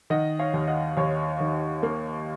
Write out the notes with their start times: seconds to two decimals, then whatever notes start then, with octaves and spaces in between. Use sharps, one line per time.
0.10 D#3 D#5 F#5
0.39 C#5 F5
0.53 D#2
0.68 D#5 F#5
0.97 D#2 C#5 F5
1.40 D#3
1.83 A#3